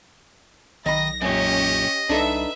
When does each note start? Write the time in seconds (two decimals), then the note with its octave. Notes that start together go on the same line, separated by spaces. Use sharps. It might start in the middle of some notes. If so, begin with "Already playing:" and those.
0.86 B1 D#3 D#5 B5 A#6
1.22 F#2 A#2 C#4 G4 D#5
2.09 C2 D4 D#4 A4 B4 E5